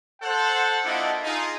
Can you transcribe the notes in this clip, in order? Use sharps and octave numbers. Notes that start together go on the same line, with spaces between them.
A4 C5 F#5
A#3 D4 E4 F4 D#5 F#5
D#4 F4 G#4